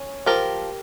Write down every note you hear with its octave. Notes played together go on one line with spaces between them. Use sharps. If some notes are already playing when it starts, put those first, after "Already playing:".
Already playing: C#4
F3 G4 A#4